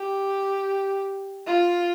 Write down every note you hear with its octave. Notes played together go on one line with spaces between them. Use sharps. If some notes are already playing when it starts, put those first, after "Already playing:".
Already playing: G4
F4